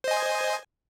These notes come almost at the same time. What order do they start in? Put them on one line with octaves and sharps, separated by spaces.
C5 D#5 G#5